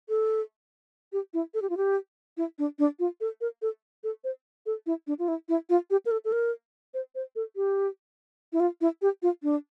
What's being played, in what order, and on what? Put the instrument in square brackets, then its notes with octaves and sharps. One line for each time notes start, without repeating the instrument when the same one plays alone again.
[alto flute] A4
G4
E4
A4
G4
F4
G4
E4
D4
D4
F4
A4
A#4
A4
A4
C5
A4
E4
D4
F4
E4
E4
F4
G4
A#4
A4
A4
A#4
C5
C5
A4
G4
E4
F4
E4
G4
F4
D4